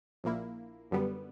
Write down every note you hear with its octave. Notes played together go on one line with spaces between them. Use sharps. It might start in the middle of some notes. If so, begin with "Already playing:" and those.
A#1 A#2 A#3 E4
F#2 D3 G3 B3